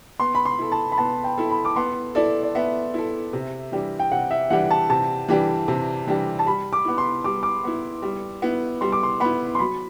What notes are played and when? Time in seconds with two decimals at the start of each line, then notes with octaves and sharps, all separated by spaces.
0.20 B3 C6
0.35 B5
0.45 C6
0.58 E4 A4
0.72 A5
0.92 B5
0.98 B3 A5
1.24 G5
1.38 E4 A4
1.51 B5
1.65 D6
1.76 B3 C6
2.15 E4 A4 D5
2.43 D5
2.55 B3 E5
2.94 E4 A4
3.33 C3
3.72 E3 G3 D4 G4
3.99 G5
4.11 C3 F#5
4.31 E5
4.50 E3 G3 D4 G4 F#5
4.71 A5
4.90 C3 A5
5.28 E3 G3 D4 G4
5.68 C3
6.07 E3 G3 D4 G4
6.39 A5
6.46 G3 B5
6.73 D6
6.85 B3 E4
6.98 C6
7.24 G3 D6
7.43 D6
7.64 B3 E4
8.02 G3
8.42 B3 E4
8.81 G3 C6
8.92 D6
9.03 C6
9.20 B3 E4 B5
9.55 C6
9.59 F#3 B5